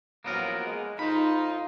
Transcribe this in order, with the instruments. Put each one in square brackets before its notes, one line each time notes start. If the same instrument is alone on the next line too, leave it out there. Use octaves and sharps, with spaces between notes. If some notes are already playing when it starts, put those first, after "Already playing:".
[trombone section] A1 F3 F#3 [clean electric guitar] A#3 B3 A#4
[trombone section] G#3
[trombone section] F2 F4 [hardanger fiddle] D#4 [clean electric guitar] C5 B5